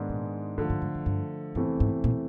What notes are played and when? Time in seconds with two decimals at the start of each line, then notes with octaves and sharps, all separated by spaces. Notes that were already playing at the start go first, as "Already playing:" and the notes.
Already playing: G#2 D#3 G#3 B3 D4
0.09 A#2
0.58 A2 D3 F3 A3
0.70 G#2
0.82 G#2
0.95 F#2
1.06 G2
1.55 E2 G2 C3 E3 A3 C4
1.80 G#2
2.04 A#2